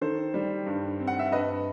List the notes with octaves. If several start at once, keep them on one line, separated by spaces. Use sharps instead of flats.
D#3 A4 C5
G3
G2
C4
F#5
E5
G2 B4 D#5